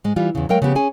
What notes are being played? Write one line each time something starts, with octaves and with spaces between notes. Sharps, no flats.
G#2 G#3
E3 G3 F4
E2 C#3
F#3 G#3 A3 A#4 F5 G5
C#3 F3 B3 G4
C#4 G#4 G#5